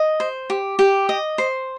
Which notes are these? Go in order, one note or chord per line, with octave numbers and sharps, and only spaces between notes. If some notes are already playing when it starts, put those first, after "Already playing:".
Already playing: D#5
C5
G4
G4
D#5
C5